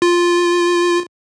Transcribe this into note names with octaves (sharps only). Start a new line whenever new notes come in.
F4